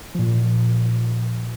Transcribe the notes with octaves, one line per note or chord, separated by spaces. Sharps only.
A#2 F3